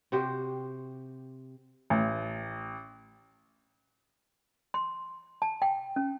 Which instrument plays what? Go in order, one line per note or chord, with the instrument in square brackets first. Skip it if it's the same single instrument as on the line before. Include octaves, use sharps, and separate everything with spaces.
[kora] C3 F#4 G4 C5
[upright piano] A1
[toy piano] C6
A5
G5
C#4